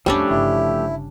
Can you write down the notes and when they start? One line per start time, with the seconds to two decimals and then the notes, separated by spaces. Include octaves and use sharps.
0.06 E2 A2 F3 G3 A3 C#4 D4 G4
0.29 G1 C#3 E4